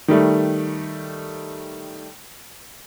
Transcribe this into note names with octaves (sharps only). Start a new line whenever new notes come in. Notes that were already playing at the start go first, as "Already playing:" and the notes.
D#3 G3 A3